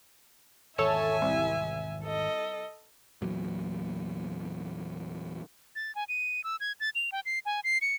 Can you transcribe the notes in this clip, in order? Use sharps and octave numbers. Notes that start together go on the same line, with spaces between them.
G#1 E2 A4 C#5 E5 G#5 A5
C2
A4 D#5
E2 A#2 F#3
A6
G#5
D#7
E6
G#6
A6
F7
G5
C7
G#5
C7
C#7